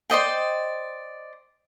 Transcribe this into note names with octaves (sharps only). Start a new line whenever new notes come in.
C5 D5 D#5 G5